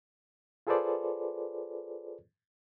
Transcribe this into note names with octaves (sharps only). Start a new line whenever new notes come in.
F4 G#4 A4 B4 C5 D5